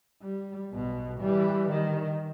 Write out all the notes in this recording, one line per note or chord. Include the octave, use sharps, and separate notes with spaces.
G3
B1 B2
E3 G3
D#3